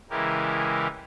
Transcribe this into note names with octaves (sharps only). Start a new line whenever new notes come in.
C#3 E3 G#3 E4 G4 A#4